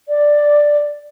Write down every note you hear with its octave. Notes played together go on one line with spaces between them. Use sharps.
D5